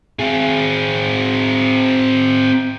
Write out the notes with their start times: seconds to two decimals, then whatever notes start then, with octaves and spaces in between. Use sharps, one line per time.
0.19 C4 G#4